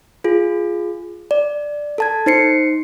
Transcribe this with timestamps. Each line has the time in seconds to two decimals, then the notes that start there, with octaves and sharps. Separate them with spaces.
0.24 F4 G#4
1.31 D5
1.98 A4 A5 G#6
2.26 D#4 C5 C7 C#7